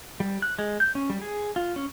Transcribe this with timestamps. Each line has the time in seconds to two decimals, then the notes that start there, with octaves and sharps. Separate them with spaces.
0.20 G3
0.42 F#6
0.59 G#3
0.80 G6
0.95 C#4
1.10 G3
1.22 G#4
1.56 F4
1.76 C#4